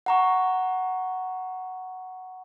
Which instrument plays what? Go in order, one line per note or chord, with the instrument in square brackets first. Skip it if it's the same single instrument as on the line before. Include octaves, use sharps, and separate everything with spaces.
[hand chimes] F#5 A#5 C#6